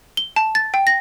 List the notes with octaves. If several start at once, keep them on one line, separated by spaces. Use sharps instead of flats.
G7
A5
A6
G5
A#6